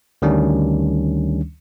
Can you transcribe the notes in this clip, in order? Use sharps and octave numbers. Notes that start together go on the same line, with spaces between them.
D2 D#3 G3 C#4 D4